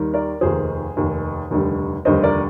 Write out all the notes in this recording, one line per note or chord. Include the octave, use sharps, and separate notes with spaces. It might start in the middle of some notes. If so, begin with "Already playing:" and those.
Already playing: D#2 D#3 G3
A#4 D5
F1 D#2 D#3 G#4 C5
F1 D#2 D#3
F1 D#2 D3 G3
F1 D#2 D3 G3 C5 D#5
A#4 D5